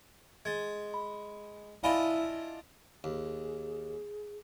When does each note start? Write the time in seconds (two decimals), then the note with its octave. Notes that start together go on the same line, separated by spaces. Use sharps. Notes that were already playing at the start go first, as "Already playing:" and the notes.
0.45 G#3 G#6 A6
0.94 B5
1.84 D4 E4 F4 D#5 F5 G#5 B5
3.04 D#2 G#4